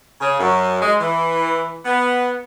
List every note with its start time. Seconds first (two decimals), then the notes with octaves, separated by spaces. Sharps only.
0.20 C#3
0.39 F#2
0.81 G#3
1.00 E3
1.85 B3